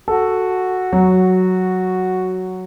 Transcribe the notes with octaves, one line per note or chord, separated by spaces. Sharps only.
F#4 A4
F#3